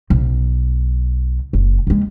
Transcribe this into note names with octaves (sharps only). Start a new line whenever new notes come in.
B1
F#1
D#2 G#3